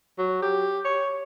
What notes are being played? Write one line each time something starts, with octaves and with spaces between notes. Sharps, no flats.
F#3
G4
C#5